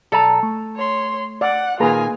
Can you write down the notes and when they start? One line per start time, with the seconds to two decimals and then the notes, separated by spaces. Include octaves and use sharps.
0.12 B1 A4 D5 A5 A#5
0.43 A3
0.76 C#5 C6
1.41 D5 F#5 F#6
1.80 A#2 D#3 A#3 F4 G#4 B4 G#5 A#5